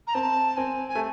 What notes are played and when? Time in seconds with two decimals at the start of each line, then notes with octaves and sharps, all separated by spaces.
0.07 A#5
0.14 C4 A5
0.57 C4 G#5
0.88 G#5
0.95 A3